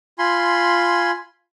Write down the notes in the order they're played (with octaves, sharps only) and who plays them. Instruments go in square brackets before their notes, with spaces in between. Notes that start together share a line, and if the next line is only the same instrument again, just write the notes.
[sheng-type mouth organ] F4 G#5 B5 C6